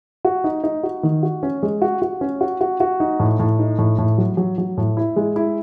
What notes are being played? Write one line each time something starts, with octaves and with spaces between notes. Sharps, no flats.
F#4
D#4
D#4
F#4
D#3
F#4
C#4
G#3
F#4
F#4
C#4
F#4
F#4
F#4
D#4
A2
A2
D#4
A2
A2
F#3
F#3
F#3
A2
E4
G#3
E4